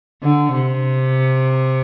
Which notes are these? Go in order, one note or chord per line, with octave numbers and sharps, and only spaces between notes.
D3
C3